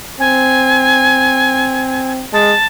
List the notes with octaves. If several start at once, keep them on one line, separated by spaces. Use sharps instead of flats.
C4 G#5
G#3 A5